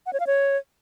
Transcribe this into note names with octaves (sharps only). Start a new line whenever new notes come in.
F#5
C#5
F5
C#5